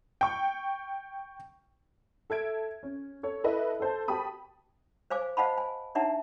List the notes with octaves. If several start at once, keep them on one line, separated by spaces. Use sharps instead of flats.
G5 C#6
A4 E5 G#6 D7
C#4
A4 C#5
E4 A4 B4 D#5 E5
A4 C5 A5
F#4 G4 A5 B5 D#6
C5 F5 G#5 D6
C5 D#5 F5 F#5 A5 B5
G#5
D4 D#4 E5 F#5 A5 A#5